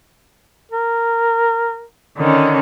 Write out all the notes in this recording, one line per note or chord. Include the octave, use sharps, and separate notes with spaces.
A#4
D3 D#3 C#4